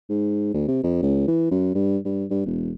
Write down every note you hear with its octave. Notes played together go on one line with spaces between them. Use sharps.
G#2
D2
C3
F2
C#2
E3
F#2
G2
G2
G2
E1